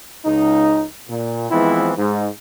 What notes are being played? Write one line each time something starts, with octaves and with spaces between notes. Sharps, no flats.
C#2 D#4
A#2
E3 F3 G#3 B3 C4 E4
G#2